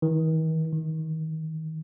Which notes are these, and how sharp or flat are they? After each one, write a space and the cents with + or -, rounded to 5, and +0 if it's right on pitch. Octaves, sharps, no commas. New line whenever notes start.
D#3 +45
D#3 +30